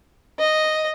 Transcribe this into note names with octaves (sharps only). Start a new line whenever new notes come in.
D#5